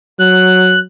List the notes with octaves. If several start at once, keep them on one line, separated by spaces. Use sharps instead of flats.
F#3 F#6